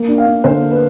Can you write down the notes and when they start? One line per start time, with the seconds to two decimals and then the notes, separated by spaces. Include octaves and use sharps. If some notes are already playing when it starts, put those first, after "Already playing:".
Already playing: A#3
0.08 D4
0.18 F5
0.27 D4
0.44 D3 C5
0.62 A#3
0.71 B4